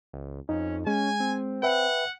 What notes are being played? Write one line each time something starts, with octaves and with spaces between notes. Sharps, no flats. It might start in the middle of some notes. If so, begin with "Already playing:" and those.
C#2
F2 C#4 D#4
G#3 C#4 G#5
C4
B4 E5 F#5 G5